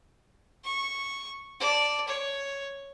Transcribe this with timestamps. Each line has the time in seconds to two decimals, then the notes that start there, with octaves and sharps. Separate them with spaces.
0.64 C#6
1.60 D5 A5
2.08 C#5